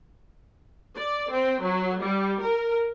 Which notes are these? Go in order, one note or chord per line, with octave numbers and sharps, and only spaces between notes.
D5
C4
F#3
G3
A#4